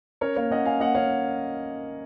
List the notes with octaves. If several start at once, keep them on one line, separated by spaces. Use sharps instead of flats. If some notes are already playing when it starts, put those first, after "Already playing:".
C#4 A#4 C#5
A#3 C#5 F5
C#4 D#5 F#5
C#4 F5 G#5
A#3 D#5 F#5
C#4 C#5 F5